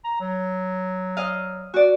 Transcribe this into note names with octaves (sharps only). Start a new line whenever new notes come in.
A#5
F#3
D#5 F5
F#4 D5